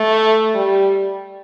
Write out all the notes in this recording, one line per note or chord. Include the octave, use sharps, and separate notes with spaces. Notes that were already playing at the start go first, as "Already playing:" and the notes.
Already playing: A3
G3